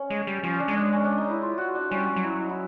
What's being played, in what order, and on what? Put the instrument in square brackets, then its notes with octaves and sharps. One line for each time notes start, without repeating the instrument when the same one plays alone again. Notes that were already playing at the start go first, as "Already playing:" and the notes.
Already playing: [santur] C#4
[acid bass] G#3
G3
[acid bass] F3 [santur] C#4
[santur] D4
[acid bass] G#3
[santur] D4
C#4
D4
D#4
E4
F4
F#4
D4
[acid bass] G3 [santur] C#4
[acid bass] F#3
[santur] E4
D#4
E4